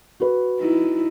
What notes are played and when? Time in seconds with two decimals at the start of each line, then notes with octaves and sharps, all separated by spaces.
0.20 F#4 B4
0.60 D#4 E4